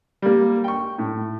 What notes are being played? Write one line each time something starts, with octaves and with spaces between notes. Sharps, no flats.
G3 A#3
G5 C#6
A2